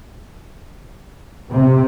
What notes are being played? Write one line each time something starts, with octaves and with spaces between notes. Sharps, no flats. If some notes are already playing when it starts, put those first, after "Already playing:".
C3